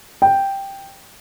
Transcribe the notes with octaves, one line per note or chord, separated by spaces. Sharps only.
G5